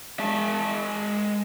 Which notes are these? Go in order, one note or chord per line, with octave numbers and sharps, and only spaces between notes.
G#3 A5